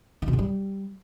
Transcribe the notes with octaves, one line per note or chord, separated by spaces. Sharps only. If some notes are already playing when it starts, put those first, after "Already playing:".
D#3
B2
G#2
G3